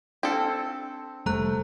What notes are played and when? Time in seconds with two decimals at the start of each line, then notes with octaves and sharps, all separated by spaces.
0.23 C4 D4 A4 F6 C#7
1.26 F1 G3 A3 C5 A#5 F#6